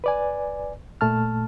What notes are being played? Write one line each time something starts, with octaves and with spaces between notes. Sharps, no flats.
B4 D5 G#5
A#2 A3 A5 F6